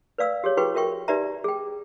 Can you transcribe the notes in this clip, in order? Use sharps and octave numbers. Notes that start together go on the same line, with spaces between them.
B4 D5 F5 E6
G4 G#4 C#5
E4 F#4 G#4 B4 G5 C#6
F#4 A#4 E5 G5 C#6
D#4 G4 B4 D5 E5 A#5
G#4 G5